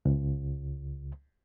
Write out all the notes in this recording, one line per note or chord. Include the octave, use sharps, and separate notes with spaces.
C#2